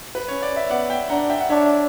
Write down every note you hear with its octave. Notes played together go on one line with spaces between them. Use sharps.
B4
C#4 C#5
D5
E5
B3 D5 F#5
E5 G5
D4 F#5 A#5
E5 G5
F#5
D4 C#5 E5